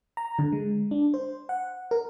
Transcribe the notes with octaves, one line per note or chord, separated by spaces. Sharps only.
A#5
D3
G#3
D4
C5
F#5
A#4